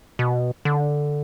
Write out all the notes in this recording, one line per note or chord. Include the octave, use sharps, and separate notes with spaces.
B2
D3